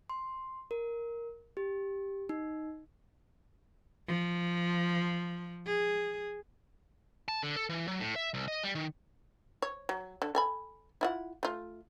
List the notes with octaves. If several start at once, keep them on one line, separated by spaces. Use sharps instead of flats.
C6
A#4
G4
D#4
F3
G#4
A5
D3
A4
E3
F#3
A2
E5
C2
D#5
G3
D#3
C#5
F#3
D3
A4 G#5 B5
E4 F4 F#5
A3 F4